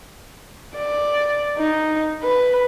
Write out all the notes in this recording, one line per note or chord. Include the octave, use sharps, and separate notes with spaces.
D5
D#4
B4